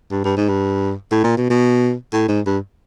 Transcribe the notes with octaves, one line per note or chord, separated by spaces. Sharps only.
G2
G2
G#2
G2
A2
A#2
B2
B2
A2
G#2
G2